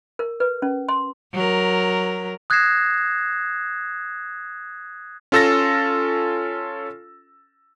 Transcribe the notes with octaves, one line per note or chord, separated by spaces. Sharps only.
A#4
B4
C#4
C6
F#3 A#4
D#6 F#6 G#6 A#6 C7 E7
C#4 F4 A4 E6 A6 A#6